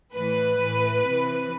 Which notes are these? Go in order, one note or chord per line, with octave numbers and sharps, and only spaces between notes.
A2 E3 B4
A2 E3
C3 E3